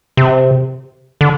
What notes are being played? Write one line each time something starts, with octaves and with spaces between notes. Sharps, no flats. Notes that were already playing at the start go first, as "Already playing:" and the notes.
C3
D3